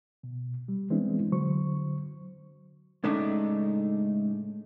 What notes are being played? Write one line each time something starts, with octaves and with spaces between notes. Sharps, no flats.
B2
G3
E3 G#3 B3 C4 D4 E4
D3 F#3 C5 C#6
A2 C#3 G#3 A3 D4 D#4